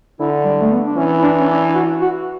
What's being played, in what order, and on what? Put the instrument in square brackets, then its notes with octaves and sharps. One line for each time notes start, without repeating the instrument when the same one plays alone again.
[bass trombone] D3 [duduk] E4
[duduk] G3
A3
B3
D4
[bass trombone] E3 [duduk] C#4
[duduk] E4
D4
C#4
D4
F#4
F#4